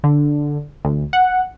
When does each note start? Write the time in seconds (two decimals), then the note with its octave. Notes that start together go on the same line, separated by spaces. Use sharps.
0.04 D3
0.85 D2
1.13 F#5